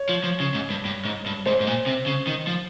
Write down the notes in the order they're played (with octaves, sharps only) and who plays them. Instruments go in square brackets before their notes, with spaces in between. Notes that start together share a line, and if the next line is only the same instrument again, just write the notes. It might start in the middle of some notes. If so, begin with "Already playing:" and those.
Already playing: [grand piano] C#5
[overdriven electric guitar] F3
F3
C#3
G#2
G2
G2
G#2
G2
[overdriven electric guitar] G#2 [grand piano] C5
[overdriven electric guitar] G#2
A#2
C3
C#3
D#3
F3